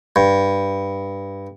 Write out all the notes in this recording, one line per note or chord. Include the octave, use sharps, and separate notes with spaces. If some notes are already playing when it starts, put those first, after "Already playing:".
G2